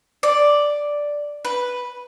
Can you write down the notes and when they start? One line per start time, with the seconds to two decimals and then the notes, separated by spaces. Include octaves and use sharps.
0.23 D5
1.45 B4